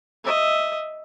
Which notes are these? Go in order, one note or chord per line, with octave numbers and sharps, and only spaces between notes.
D#5 E5